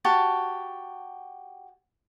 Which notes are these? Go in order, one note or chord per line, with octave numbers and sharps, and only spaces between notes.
F#4 G4 A5